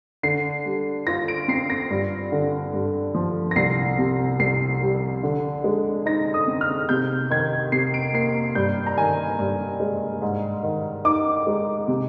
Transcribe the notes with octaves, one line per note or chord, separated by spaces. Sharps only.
D3 C7
G3
F4 A#6
D7
C4 C7
A#6
G2
D3
G2
F3
A#6
C2 C7
C3
C2 C7
G3
D3
G#3
D#4 A#6
D#6
C4
F6
C3 G6
D#3 G#6
C3 C7
D7
A#3 C7
G2 G6
A#5
D#3 G#5
G2
G#3
G#2
D#3
D#4 D6
G#3
C3